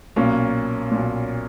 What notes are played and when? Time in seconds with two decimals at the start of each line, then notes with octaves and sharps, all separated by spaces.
0.16 B1 A#2 A#3 C#4
0.92 B1 A#2